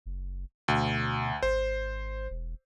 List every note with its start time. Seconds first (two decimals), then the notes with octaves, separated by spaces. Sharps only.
0.06 F#1
0.68 D2 B2
1.43 G#1 C5
2.30 E1